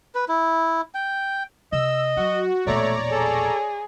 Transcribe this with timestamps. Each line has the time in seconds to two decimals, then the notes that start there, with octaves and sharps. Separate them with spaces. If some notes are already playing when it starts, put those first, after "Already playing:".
0.15 B4
0.28 E4
0.94 G5
1.72 C3 D#5 E6
2.17 F#3 F#4
2.66 E1 A#1 A3 C#5 D5 A#5
3.12 G#4 A4